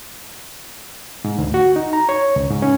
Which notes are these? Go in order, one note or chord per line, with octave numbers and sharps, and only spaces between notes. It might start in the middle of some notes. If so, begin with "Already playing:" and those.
G#2
D2
F#4
D#4
A#5
C#5
C#2
G#2
C#4